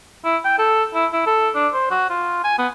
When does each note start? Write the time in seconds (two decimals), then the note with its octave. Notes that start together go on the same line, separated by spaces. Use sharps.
0.24 E4
0.45 G5
0.58 A4
0.94 E4
1.13 E4
1.26 A4
1.55 D4
1.73 C5
1.91 F#4
2.10 F4
2.44 G#5
2.58 B3